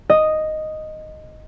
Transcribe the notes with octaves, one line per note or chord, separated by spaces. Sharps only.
D#5